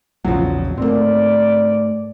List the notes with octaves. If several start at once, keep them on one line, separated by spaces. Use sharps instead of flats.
A#1 E2 C#3 F3 F#3
G#2 A3 A#3 C4 D5